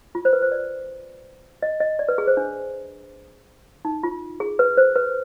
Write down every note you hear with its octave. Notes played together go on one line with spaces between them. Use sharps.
F4
C5
B4
C5
D5
D#5
D#5
D5
B4
G#4
C5
D4
D#4
F4
G#4
B4
C5
B4